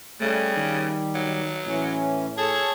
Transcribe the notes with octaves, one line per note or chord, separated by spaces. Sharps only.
C#3 G3 A3
D#3
F#3
A2 E3 C#4
G#4 A4 C#5 A5